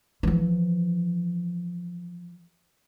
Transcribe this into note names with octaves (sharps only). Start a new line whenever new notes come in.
E3 F3